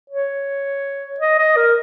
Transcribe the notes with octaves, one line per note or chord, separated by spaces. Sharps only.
C#5
D#5
D#5
A#4